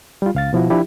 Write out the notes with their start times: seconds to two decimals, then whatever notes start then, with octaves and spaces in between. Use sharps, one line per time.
0.22 G3 F4
0.35 C#2 F5 A6
0.53 B2 F3 E4 F#4
0.70 F3 D4 E4 G4